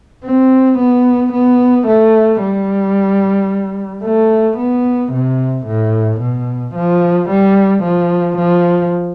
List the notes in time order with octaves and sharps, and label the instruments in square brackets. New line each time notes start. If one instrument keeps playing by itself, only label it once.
[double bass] C4
B3
B3
A3
G3
A3
B3
C3
A2
B2
F3
G3
F3
F3